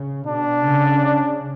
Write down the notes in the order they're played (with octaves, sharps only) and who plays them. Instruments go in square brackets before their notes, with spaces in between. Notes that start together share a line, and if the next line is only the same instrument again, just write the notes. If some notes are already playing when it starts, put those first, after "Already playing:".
Already playing: [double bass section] C#3
[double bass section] B2 [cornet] D4
[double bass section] C#3